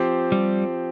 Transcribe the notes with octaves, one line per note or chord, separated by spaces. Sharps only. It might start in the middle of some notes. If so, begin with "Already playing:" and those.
Already playing: F3 C4 G4
G3